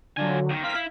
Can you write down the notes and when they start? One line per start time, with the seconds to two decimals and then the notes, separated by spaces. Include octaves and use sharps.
0.17 D3 F#3 F4 G#5
0.49 B1 D#3
0.63 C4 A#4 F5 B6
0.75 E4